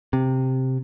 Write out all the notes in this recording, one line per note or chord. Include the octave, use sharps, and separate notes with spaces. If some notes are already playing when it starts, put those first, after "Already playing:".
C3